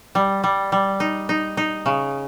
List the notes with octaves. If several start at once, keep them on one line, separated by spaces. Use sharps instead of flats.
G3
G3
G3
D#4
D#4
D#4
C#3